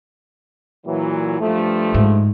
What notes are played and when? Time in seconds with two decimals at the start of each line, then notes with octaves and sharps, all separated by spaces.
0.86 A#2 E3 F#3
1.40 G2 F3 A3
1.94 G#2